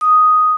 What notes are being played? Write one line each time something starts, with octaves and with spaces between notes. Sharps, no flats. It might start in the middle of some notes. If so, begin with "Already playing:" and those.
D#6